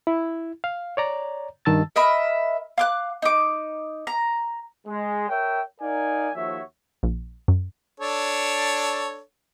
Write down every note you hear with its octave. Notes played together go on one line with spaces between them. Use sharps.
E4
F5
C#5 D5 A#5
G2 D#3 A5 E6 A6
A#4 D#5 E5 B5
F5 D6 F#6
D#4 D6
A#5
G#3
A#4 C#5 E5 G5
D#4 A#4 D5 F5 G#5
D#2 F3 F#4 C#5 E5
A#1
F#2
D4 A4 C#5